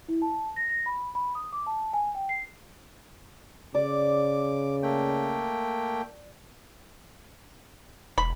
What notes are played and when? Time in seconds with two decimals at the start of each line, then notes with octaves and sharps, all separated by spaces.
0.09 E4
0.22 A5
0.56 A#6
0.70 A#6
0.86 B5
1.15 B5
1.35 D#6
1.52 D6
1.67 A5
1.93 G#5
2.15 G5
2.29 C7
3.75 C#3 D5 D6
4.83 A3 A#3 G5
8.18 E1 B5